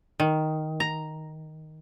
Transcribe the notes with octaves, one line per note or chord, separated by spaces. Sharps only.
D#3
A#5